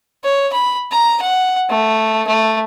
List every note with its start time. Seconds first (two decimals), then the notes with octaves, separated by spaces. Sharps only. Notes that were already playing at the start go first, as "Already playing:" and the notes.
0.24 C#5
0.53 B5
0.91 A#5
1.22 F#5
1.70 A3
2.27 A3